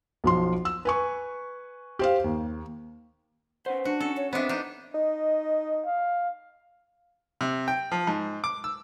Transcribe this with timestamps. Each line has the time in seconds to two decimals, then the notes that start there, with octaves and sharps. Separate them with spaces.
0.24 B1 F3 C6
0.65 E6
0.85 B4 G#5 C#6
1.99 G4 C5 F5
2.24 D#2
3.66 C#4 B4 C5 F#5
3.85 D4 F#4
4.00 C#4 A4
4.17 C#5
4.33 B3 C4 D4 C5 D#5 E5
4.49 D4 D#4
4.94 D#4 D#5
5.86 F5
7.41 C3
7.68 G5
7.92 F3
8.07 G#2
8.44 D6
8.64 E6